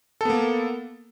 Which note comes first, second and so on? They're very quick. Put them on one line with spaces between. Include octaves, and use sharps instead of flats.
A4 B3 A#3